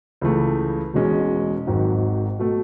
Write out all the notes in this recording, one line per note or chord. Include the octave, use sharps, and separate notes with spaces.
C#2 C#3 E3 A3
E1 E2 B2 G#3 C#4
G#1 G#2 D#3 F#3
B2 A3